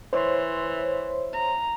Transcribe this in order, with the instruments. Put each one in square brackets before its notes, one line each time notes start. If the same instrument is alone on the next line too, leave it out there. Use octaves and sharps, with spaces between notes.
[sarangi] E3 [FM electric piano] C5 C#5 C6
[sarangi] A#5